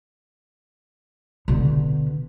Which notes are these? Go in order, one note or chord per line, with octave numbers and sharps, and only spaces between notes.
B2 D3